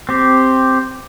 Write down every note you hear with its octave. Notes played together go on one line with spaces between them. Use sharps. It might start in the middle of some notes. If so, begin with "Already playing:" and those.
C4 G4